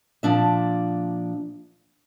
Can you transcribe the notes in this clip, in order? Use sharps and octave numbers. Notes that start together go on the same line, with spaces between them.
A#2 F3 D4 E5